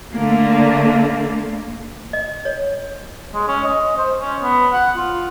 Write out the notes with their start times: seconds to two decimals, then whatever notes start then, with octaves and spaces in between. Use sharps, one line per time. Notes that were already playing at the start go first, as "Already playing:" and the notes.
0.15 D3 A3 A#3
2.13 D#5
2.45 C#5
3.34 G#3
3.48 C#4
3.64 D#5
3.98 C5
4.21 C#4
4.42 B3
4.73 F#5
4.97 F4